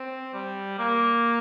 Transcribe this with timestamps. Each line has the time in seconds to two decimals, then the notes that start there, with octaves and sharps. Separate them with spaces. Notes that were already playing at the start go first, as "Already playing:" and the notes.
Already playing: C4
0.33 G3
0.79 A#3